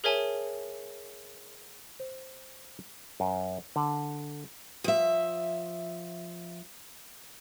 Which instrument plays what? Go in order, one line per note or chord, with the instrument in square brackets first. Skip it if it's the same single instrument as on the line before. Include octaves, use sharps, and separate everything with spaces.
[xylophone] G#4 A#4 C#5 E5 G#5 A5
[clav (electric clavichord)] C5
F#2
D3
[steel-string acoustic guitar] F3 E5